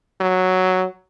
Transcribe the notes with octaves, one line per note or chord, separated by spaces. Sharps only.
F#3